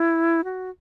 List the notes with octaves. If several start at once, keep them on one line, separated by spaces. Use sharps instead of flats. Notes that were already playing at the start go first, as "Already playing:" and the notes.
Already playing: E4
F#4